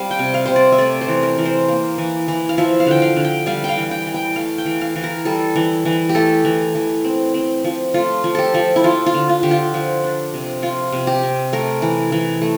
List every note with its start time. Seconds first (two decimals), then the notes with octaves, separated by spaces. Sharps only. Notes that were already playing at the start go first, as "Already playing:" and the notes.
Already playing: G3 C4 F5
0.11 G5
0.19 C3
0.34 F5
0.46 C3 C5
0.56 D5
0.72 E5
0.78 A3 D5
1.01 C5
1.08 E3
1.23 A#4
1.38 E3
1.45 C5
1.68 A#3
1.98 E3
2.28 E3
2.49 F5
2.58 F3 E5
2.80 F5
2.87 D3 G5
3.02 F5
3.16 D3
3.25 G5
3.46 G3 F5
3.64 F5 G5
3.77 E3
3.91 G5
4.06 E3
4.14 G5
4.36 A3 F5
4.58 G5
4.66 E3
4.81 F5
4.96 E3
5.04 A#4
5.25 G3 A4
5.56 E3
5.85 E3
6.09 G4
6.15 A3 A4
6.45 E3
6.75 E3
7.04 C4
7.34 C4
7.64 F3
7.94 A3 F4
8.24 F3
8.35 G4 A4
8.54 F3
8.76 E4
8.84 F3 F4
9.06 F4
9.14 D3
9.29 F4
9.43 D3 G4
9.51 F4
9.74 F3
10.04 D4
10.34 C3
10.62 F3 F4
10.92 C3
11.07 G4
11.23 C3
11.53 A3 A#4
11.82 E3
12.12 E3
12.42 A3